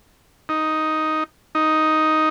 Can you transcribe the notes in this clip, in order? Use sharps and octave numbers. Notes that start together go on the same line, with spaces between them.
D#4
D#4